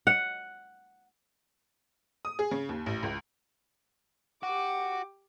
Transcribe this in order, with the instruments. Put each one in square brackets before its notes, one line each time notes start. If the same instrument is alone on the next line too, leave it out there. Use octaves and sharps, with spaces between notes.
[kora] F#5
[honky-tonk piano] D#6
G#4
C#3
D#2
A1
C#2
[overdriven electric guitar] F#4 [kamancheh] G4 D6